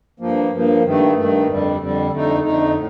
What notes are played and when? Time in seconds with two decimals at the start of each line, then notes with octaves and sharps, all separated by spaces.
0.20 G2 F3 A#3
0.51 G2 F3 A#3
0.84 G2 D#3 A3
1.15 G2 D#3 A3
1.47 F2 D3 G3
1.80 F2 D3 G3
2.11 F2 D3 A3 D#4
2.42 F2 D3 A3 D#4
2.74 A2